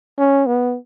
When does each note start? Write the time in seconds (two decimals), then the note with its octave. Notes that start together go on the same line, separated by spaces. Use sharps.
0.18 C#4
0.46 B3